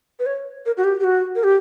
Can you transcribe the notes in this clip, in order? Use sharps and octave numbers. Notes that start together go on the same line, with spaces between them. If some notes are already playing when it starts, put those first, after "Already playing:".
B4
C#5
A#4
F#4
G4
G4
F#4
A#4
G4